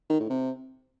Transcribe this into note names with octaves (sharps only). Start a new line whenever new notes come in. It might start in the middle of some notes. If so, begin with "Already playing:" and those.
D#3
A2
C3